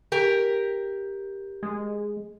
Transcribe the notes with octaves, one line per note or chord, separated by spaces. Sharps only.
G4 A#4
G#3